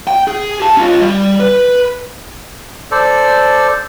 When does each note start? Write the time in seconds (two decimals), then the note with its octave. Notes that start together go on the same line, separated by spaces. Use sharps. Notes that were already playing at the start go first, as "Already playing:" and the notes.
0.07 G5
0.28 G#4
0.60 G4 A5
0.77 C#4 F4
1.01 G3
1.40 B4
2.91 A4 C5 D5